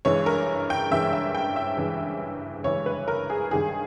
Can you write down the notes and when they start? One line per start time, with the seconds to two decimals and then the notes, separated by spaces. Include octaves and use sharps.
0.05 G2 E3 G#3 C#5
0.26 A#4
0.70 G5
0.91 G2 E3 G#3 E5
1.13 E5
1.35 G5
1.56 E5
1.78 G2 E3 G#3
2.64 G2 E3 G#3 C#5
2.86 B4
3.08 A#4
3.30 G#4
3.51 G2 D#3 G3 G#4